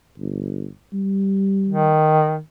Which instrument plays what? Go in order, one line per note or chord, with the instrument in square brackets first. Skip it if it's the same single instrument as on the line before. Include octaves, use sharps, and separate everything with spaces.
[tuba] G1
G3
[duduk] D#3